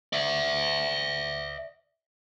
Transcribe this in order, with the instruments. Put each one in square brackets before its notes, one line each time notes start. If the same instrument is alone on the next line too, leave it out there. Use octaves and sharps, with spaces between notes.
[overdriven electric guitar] D5 E5